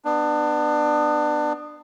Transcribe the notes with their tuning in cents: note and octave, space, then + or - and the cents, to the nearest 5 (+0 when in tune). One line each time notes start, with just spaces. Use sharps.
B3 +0 D4 +25